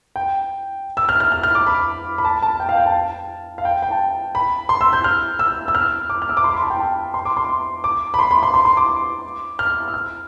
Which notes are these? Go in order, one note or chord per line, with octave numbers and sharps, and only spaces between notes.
G5
E6
F6
F6
F6
F6
D6
B5
B5
A5
A5
G5
F5
G5
A5
F5
G5
G5
A5
B5
C6
E6
G6
F6
E6
E6
F6
D6
F6
E6
D6
C6
B5
A5
G5
A5
C6
D6
C6
D6
B5
C6
B5
C6
C6
C6
D6
F6
E6
F6